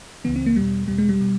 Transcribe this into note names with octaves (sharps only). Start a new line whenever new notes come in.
C#2 C#3 E3 B3
C4
A#3
E2 B2 G3
E2 B2 G3
G#3
G3
B2